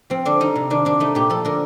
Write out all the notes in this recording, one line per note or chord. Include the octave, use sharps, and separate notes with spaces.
F3 C4
D3 D4
G3 D#4
C3
D#3 D4
C3 D4
A3 D#4
A#2 G4
F3 A4
D3 A#4